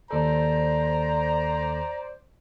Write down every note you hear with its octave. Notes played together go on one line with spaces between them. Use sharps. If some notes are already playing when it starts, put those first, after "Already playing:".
D#2 A4 C5 D5 A#5